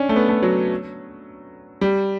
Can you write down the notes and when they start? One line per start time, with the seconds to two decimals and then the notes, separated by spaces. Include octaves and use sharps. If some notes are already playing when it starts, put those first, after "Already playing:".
Already playing: C#4 D4
0.09 A3
0.16 B3
0.29 A3
0.43 F#3
1.81 G3